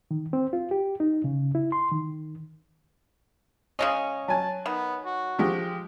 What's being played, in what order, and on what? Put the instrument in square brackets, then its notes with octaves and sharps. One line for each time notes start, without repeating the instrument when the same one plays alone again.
[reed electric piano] D#3
C4
F4
G4
D#4
C#3
E4
C6
D#3
[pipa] C#3 G#3 C#4 [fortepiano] D#5
[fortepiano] F#3 G#5 [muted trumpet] A5
[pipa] D#3 [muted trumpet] B3
[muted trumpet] F#4
[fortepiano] F3 G#3 G4